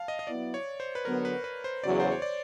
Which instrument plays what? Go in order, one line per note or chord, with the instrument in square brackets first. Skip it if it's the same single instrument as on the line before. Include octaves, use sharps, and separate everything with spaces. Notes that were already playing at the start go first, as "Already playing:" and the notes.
Already playing: [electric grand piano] F5 A5
D#5
D#5
[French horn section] F#3 B3 E4 [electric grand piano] D5
[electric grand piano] C#5
C5
B4
[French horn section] D3 F#3 B3 [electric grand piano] A#4
[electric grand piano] B4
B4
C5
[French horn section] E2 C#3 F#3 [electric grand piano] D5
[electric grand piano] C5
C#5
D5